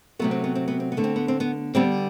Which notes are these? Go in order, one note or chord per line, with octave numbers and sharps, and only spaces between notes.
C3 F#3 A3 B3
C4
B3
C4
B3
C4
B3
D3 A3
C4
B3
C4
B3
D3 G3 B3 C4